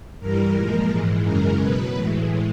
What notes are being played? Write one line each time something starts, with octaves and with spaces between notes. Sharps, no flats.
G2 E3 G3 A#4
A#2 F3 G#3 A#4
G#2 E3 G#3
F#2 C#3 E3 G#3 A#4
B2 F#3 B4
A2 E3 G#3